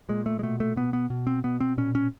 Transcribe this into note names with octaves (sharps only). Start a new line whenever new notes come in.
A#2 G#3
A3
G#3
B2 A3
A3
B2 B3
B3
B2
C4
B2 B3
C4
A#2 C#4
C#4